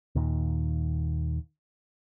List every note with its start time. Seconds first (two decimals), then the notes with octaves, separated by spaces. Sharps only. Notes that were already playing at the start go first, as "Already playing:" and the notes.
0.15 D#2 A#2 D#3